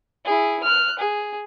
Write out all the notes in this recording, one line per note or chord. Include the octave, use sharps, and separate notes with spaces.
E4 G#4
F6 F#6
G#4